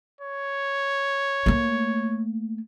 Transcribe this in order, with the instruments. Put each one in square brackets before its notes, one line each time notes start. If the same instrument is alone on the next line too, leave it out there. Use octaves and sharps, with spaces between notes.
[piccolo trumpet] C#5
[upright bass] A3 A#3